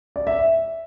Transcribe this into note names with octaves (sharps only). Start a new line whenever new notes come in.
D5
E5